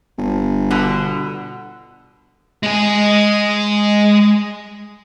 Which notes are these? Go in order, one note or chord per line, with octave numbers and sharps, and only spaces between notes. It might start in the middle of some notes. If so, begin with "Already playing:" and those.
G1
B2 D3
G#3 G#4